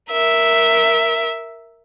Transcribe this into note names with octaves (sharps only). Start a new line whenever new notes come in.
A#4 E5